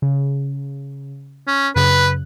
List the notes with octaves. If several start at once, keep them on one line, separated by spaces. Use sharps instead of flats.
C#3
C#4
F#2 C#3 B4 F#6